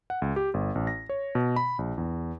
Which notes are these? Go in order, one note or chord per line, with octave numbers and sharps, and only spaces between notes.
F#5
C#2
G4
G1
A1
A#6
C#5
B2
B5
A#1
E2